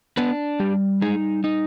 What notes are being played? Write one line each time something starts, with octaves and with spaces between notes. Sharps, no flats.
B3 D4 B4
G3 G4
G#3 D#4 G#4
D#4